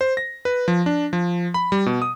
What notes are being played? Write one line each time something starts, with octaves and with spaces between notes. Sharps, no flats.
C5
A#6
B4
F3
D4
F3
B5
G3
B2
D#6